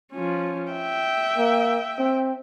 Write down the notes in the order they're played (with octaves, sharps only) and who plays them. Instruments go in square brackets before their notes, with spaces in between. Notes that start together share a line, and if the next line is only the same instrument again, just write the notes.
[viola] F3 C#4
E5 G5
[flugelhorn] A#3
C4